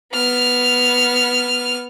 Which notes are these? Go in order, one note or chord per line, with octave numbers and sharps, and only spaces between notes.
B3 F6